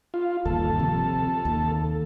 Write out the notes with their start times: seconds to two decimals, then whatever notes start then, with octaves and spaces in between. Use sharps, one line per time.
0.14 F4
0.45 G1 D#2 A4
0.79 C3 F3
1.45 D#2